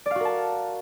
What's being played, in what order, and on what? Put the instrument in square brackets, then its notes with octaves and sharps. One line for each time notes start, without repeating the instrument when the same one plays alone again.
[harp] D5
F5
F#4
A#4
A5